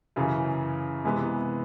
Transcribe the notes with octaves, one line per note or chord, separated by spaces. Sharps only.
F#2 C#3 E3
C3 E3 G#3 B3